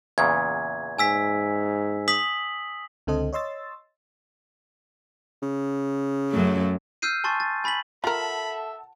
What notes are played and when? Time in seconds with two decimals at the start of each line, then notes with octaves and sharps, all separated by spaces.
0.18 E2 A#2 C#3 G#6
0.99 G#2 G#5 E6 B6
2.08 D#6 B6 F#7
3.07 C#2 D3 C4 A4 C5 D#5
3.33 C#5 D#5 C6 E6 A6
5.42 C#3
6.30 F#2 F#3 A3
7.02 E6 F6 G6 C7 D#7
7.24 G#5 A5 C6 C#6 A6
7.40 A6
7.64 G#5 B5 A6 B6 F#7
8.04 F4 A4 A#4 E5 F#5 A5 B5